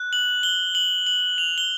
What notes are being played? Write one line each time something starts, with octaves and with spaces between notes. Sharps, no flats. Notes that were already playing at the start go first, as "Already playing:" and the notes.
Already playing: F#6
F#7
G7
F#7
F#7
F7
G7